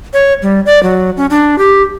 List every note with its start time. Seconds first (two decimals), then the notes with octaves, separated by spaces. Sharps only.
0.13 C#5
0.42 G3
0.66 D5
0.83 F#3
1.17 C#4
1.30 D4
1.58 G4